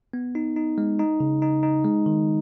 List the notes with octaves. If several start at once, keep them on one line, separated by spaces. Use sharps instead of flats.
B3
D#4
D#4
G#3
D#4
C#3
D#4
D#4
G#3
D#3